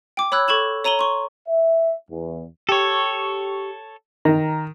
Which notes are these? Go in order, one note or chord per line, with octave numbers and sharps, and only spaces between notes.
G5 D6
C#5 B5 E6 F#6 G#6
A4 C#6 G#6 E7 F#7
C#5 A#5 D#7 F#7 G7
C6 C#6
E5
E2
G4 A4 C#5 C#6
D#3 A#5